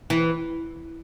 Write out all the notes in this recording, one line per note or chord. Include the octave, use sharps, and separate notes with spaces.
E3